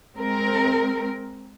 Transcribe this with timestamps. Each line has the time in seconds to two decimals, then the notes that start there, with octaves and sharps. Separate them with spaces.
0.17 G#3 C4 A#4